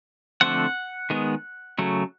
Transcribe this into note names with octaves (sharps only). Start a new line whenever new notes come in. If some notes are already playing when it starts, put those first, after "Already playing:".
D3 F3 A3 C4 F#5
D#3 G#3 B3
C#3 F#3 A3